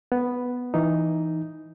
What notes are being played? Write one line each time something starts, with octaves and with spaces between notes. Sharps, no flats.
B3
E3 D#4